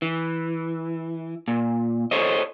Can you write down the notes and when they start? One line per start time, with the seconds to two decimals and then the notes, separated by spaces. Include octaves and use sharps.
0.02 E3
1.48 A#2
2.11 A4 C5 C#5 D#5